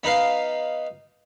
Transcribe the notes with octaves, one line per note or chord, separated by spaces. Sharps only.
B3 D#4 B4 F5